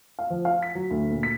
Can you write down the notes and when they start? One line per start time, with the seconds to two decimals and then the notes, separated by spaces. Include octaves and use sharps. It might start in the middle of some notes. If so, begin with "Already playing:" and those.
0.19 F5
0.30 F3
0.45 F5
0.63 B6
0.75 F#3
0.91 D2
1.11 A#2
1.23 B6